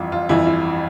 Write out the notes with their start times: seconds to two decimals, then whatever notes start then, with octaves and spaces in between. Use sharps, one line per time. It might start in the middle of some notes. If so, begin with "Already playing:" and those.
Already playing: G1 F2 E3 F4 E5
0.12 F4
0.29 G1 F2 E3 E4
0.46 E4